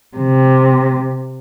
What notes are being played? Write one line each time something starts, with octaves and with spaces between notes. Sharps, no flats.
C3